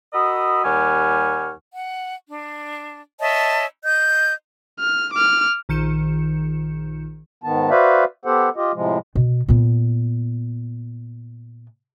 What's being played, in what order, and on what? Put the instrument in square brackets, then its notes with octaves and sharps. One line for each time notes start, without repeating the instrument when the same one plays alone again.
[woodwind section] F#4 A#4 D#5 B5 D#6 E6
D#2 G3 F#5 G#5 C#6 F6
[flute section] F#5
D4
C#5 D#5 E5 A5
D#5 G6
[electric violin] F6
D6 F6
[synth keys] A#1 D#3 G6 C#7 E7
[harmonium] G#2 D#3 B3 A5
F#4 B4 C5 D5 E5 F5
B3 G4 A4 C5 F#5
F4 G4 D#5
A2 C3 F3 G#3
[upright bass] B2
A#2 B3